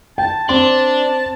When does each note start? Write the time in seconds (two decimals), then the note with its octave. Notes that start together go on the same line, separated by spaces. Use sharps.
0.18 G5 A5
0.49 C4 D4 A5 C6